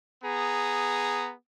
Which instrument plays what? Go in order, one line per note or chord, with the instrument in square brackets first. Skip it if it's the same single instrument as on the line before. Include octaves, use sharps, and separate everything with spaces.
[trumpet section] B3 G#4 A#5